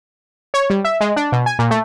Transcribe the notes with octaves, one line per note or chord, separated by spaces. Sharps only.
C#5
G3
E5
G#3
D4
B2
G#5
A#2
A3